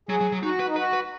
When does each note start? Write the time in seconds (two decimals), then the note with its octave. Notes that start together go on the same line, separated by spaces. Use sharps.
0.09 F#3 G#4
0.20 F#3
0.32 F#3
0.43 D#4 F#4
0.60 B4
0.67 D#4
0.76 F#4 B4
0.93 B4